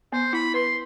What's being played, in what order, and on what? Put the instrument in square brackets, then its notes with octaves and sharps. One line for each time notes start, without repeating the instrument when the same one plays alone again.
[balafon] B3 [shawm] C5
[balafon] E4 [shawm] B5
[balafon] B4 [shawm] C6